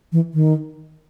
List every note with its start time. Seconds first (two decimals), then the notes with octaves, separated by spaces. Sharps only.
0.12 E3
0.34 D#3